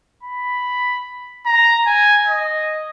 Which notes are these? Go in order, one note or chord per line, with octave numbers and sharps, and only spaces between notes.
B5
A#5
G#5
D#5